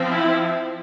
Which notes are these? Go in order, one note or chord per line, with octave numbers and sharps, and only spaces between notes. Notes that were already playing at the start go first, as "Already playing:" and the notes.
Already playing: F3 C4
E4